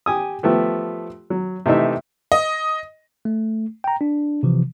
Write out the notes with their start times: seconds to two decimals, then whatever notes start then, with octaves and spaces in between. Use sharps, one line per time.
0.06 G4 G#5 D#6
0.43 F3 A3 B3 G4
1.30 F#3
1.66 C3 E3 A3 D#4 E5
2.32 D#5
3.25 A3
3.84 G5 A#5
4.01 D4
4.43 C3 E3 F3